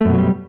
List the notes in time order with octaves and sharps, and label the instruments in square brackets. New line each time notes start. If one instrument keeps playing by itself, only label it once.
[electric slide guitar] A3
F#2
B2
F#3
G3